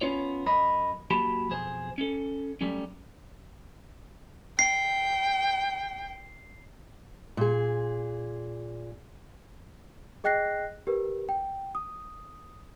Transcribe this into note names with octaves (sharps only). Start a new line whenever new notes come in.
B3 C#4 F4 C#5
F#2 A#4 D#5 B5
F#2 F#3 A#3 G4 A5 B5
B1 F2 G#4 C5
C#4 A4
F#3 G3 A3 C#4
G5 C7
A#2 G#4
G#4 D#5 G5 F#6 A#6 C7
G4 A#4 B4
G5
D#6